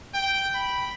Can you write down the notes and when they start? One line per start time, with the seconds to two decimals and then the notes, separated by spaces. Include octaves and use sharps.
0.14 G5
0.55 B5